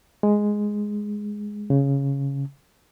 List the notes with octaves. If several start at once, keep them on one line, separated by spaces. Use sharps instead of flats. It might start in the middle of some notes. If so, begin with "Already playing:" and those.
G#3
C#3